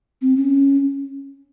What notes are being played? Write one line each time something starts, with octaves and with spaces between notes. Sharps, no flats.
C4
C#4